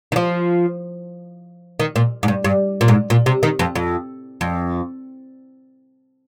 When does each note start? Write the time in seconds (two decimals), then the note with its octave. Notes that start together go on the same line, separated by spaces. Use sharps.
0.12 D#3
0.16 F3
1.80 D#3
1.96 A#2
2.23 G#2
2.28 G2
2.44 G2
2.81 A#2
2.88 G#2
3.10 A#2
3.26 C3
3.43 D#3
3.59 F2
3.76 F2
4.41 F2